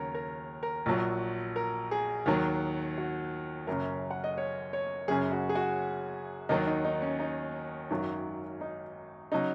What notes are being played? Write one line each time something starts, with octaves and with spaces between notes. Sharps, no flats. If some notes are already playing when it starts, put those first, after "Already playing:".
Already playing: D#2 C#3 F#3 A#4 C#5
A#4
A#4
A#1 A#2 F#3
A#4
G#4
D#2 D#3 F#3
F#4
F#1 F#2 C#3 A#4
F#5
D#5
C#5
C#5
F#1 F#2 C#3 G#4
F#4
G#4
F#4
D#2 D#3 F#3 D#4
D#4
D#4
C#4
D#4
G#1 F#2 D#3 F#3
D#4
C#3 F#3 D#4